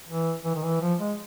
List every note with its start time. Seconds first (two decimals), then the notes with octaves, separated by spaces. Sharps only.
0.08 E3
0.45 E3
0.55 D#3
0.63 E3
0.81 F3
1.00 G#3